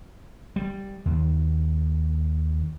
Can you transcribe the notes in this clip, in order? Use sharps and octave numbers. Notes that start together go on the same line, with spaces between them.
G3
D#2